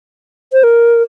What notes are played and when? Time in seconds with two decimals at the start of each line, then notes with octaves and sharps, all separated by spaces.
0.53 C5
0.64 A#4